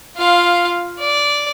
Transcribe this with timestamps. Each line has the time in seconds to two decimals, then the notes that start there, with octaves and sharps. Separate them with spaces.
0.16 F4 F5
0.99 D5